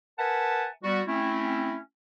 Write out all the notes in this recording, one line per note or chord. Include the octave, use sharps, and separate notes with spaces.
A#4 B4 E5 F#5 G#5 A5
G3 B3 F#4
A3 C4 C#4 E4